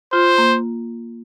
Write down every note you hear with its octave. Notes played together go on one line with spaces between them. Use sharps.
F4 C5
A#3